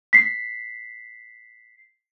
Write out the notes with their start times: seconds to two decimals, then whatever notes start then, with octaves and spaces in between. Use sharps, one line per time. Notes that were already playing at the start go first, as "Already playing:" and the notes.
0.13 B6 C7